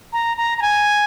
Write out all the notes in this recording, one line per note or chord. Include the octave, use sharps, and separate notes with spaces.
A#5
A#5
A#5
G#5